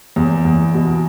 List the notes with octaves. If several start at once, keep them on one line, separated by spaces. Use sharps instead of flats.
E2
E2
B2